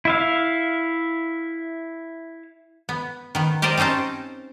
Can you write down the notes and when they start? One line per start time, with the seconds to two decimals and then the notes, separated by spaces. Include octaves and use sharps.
0.05 E4 E5 F5
2.89 B3
3.35 D#3 B3
3.62 G4 A#4 C5 D5 D#5
3.77 C4 C#4 D#4 C5 A5